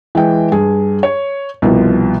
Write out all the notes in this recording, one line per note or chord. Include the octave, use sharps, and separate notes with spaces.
E3 G#3 G5
G2 G#4
C#5
C2 B2 F3